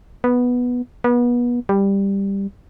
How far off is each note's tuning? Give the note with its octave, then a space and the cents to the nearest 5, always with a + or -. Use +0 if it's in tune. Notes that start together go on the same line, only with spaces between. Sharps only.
B3 -5
B3 -30
G3 +10